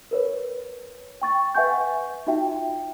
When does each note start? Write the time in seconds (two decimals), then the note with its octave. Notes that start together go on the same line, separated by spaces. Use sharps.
0.11 A#4 B4 C#5
1.22 G5 C#6 A6
1.55 B4 E5 F#5 G#5 C#6 G6
2.27 D#4 F4 F#4 E5 G5